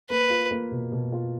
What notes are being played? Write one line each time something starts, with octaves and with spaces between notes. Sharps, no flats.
A#3 B4
F4
A#3
B2
B2
F4